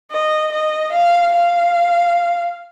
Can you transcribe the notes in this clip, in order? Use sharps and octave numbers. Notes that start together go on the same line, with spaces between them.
D#5
D#5
F5
F5